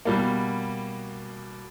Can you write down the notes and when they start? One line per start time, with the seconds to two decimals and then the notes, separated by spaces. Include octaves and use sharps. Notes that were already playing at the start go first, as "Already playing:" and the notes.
0.05 B2 G3 A#3